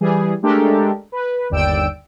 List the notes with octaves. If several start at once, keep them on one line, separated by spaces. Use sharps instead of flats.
E3 G3 G#4
G#3 A3 D4 G4 A4 A#4
B4
G1 D#2 D5 G5 E6 D7